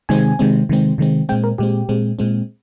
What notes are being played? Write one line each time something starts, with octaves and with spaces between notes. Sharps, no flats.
C3 D#3 G#3 C4 G#5
C3 D#3 G#3 C4
C3 D#3 G#3 C4
C3 D#3 G#3 C4
A#2 G#3 C4 G5
A#4
A#2 G#3 C4 G4
A#2 G#3 C4
A#2 G#3 C4